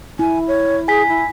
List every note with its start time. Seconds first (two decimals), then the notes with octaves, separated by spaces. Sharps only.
0.19 E4 G#5
0.48 C#5
0.88 G#4 G#5 B6
1.08 E4